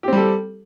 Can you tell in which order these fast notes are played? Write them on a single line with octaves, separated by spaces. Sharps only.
G4 C4 G3 A4